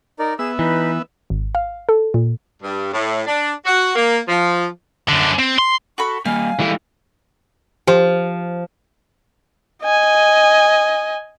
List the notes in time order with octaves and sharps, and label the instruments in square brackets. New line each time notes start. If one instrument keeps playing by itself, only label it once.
[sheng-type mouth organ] D#4 A#4 D5
[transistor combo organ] B3 E5 [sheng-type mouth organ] G#4 E6
[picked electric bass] E3 [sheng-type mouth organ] D#4 B4
[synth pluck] G#1
F5
A4
A#2
[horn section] G2
A2
D4
F#4
A#3
F3
[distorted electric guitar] F#2 D3
C4
C6
[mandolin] F#4 A4 B5 [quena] C#6
[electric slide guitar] G3 A#3 [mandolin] F5 [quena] G#5
[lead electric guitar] E3 [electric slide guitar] G3 G#3 A4
[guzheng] F3 [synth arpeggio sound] G4 C5
[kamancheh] D#5 G#5